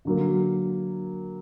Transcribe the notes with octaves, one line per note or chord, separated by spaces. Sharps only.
D3 F#3 A#3